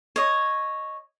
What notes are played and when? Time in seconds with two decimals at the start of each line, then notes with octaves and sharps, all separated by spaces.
0.16 C#5 D#5